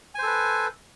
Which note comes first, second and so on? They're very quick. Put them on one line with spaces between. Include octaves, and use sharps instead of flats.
G#5 C5 A4 B4